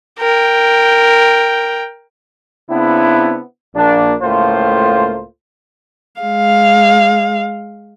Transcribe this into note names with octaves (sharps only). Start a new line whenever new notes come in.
A#4 G5
C#3 B3 C4 D4 E4
A#1 A#3 D4
C#2 A2 A3 A#3 F4 C5
G#3 F5